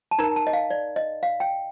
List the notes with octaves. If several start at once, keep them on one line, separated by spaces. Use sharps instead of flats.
A5
D#4 A#4 A#5
A5
D#5
F5
D5
D#5
F5
G5